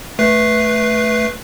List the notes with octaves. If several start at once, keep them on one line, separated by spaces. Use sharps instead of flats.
A3 B4 C7